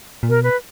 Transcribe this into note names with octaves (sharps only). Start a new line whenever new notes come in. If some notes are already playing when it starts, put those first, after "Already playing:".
A#2
B2 A#4
B4